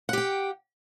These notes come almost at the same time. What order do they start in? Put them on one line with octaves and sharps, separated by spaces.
F#5 G4 G5